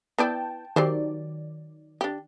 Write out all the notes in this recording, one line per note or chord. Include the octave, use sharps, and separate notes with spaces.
B3 E4 D5 G5 A5
D#3 F#3 G4 C5 D5
D4 G4